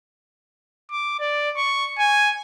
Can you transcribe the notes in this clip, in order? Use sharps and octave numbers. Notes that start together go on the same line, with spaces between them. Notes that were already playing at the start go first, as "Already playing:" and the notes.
D6
D5
C#6
G#5